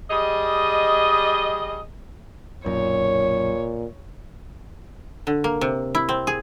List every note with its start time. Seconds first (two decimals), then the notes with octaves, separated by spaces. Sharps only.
0.11 G3 G#4 D#5
2.66 B1 F#2 A#2 C#5
5.27 D3
5.44 A#3
5.61 C3
5.95 E4
6.09 C4
6.27 G#4